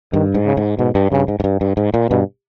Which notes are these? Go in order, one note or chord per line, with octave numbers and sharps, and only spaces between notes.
G2 D#3
G#2
C#3
G#2
G#2 B2
G2
G2 C#3
G#2
G#2
G2
G2
G#2
A#2
G2 B2